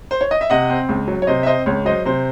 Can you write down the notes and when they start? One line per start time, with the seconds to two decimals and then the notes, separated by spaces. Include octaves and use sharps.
0.11 C5
0.21 C#5
0.31 D#5
0.41 E5
0.50 C3 D#5 F#5
0.70 C4
0.89 C#2
1.08 F#3
1.22 C#5
1.27 C3 C5 D#5
1.43 E5
1.47 C4 C5 D#5
1.66 C#2 C#5
1.85 F#3 C5 D#5
2.05 C3 C5